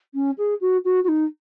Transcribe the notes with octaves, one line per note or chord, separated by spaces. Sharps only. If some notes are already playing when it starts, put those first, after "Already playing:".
C#4
G#4
F#4
F#4
F#4
D#4